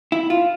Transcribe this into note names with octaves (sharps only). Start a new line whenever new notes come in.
E4
F4